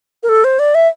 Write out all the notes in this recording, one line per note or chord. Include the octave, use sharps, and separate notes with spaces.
A#4
A4
C5
D5
E5